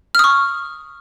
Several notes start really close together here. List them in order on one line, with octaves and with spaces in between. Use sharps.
F6 D#6 C#6